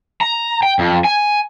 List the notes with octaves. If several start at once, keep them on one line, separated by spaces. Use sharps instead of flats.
A#5
G5
F2
G#5